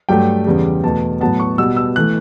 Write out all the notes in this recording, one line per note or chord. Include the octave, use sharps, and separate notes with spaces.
G2 F#3 A3 G5
E2 C#3 G3
E2 B2 A3 A5
A2 F#3 B3 A5
C#6
B2 G3 B3 E6
E6
E3 A3 F#6